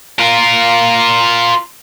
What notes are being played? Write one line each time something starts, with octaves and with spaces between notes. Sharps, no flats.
F4 A#4